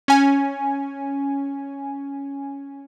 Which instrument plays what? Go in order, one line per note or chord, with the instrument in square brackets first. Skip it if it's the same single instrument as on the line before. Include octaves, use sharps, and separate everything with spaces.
[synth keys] C#4 G#5